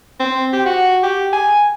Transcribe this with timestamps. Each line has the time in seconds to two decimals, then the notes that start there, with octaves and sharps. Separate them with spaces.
0.20 C4
0.53 G4
0.66 F#4
1.03 G4
1.33 G#5